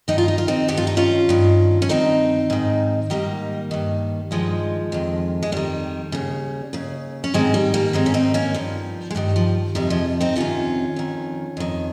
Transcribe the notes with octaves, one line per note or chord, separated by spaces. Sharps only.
G2 D#3 D#4
F4
D#4
F4
C4 D#4
G2 D#3 G4
F4
D#4
C#4 F4
G2 D#3
C#4
G2 D#3 C4 D#4
G#2 D#3
G#2 D#3 G3 A#3
G2 D#3
G2 D#3 F3 G#3
F2 D#3
G#3
F2 D#3 G3
D#2 C#3
D#2 C#3
C#4
G#2 D#3 G#3 C4
G3
G3 A#3
G#2 D#3 G#3 C4
C#4
C4 D#4
A#3 C#4
G2 D#3 F3
G#3
G2 D#3 G3
F3
F2 C3 D#3 G3
F3 G#3
C4 D#4
F2 C3 D#3 C#4 F4
F2 D#3
F2 D#3